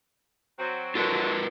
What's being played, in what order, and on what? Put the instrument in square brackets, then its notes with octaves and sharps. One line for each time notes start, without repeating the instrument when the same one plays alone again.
[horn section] F#3 C4 F#4
[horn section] D3 F#3 [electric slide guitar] F4 A#4 B4